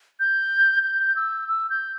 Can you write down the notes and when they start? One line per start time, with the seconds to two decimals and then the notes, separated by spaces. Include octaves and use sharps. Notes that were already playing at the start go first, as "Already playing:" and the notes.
0.20 G6
0.83 G6
1.16 E6
1.49 E6
1.70 G6